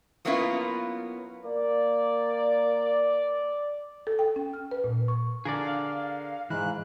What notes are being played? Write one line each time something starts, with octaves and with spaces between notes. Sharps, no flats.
F#3 A#3 B3 C#4 E4 F4
A#3 D5
A4
G5
C#4
F6
B4
A#2
C#6
D3 G#4 A#4 D5 F5
G#2 E3 B5 F#6